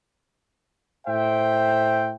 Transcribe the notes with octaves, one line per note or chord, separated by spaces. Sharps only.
A2 C5 E5 G5